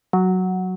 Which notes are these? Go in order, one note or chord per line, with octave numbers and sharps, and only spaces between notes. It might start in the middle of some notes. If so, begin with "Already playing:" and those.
F#3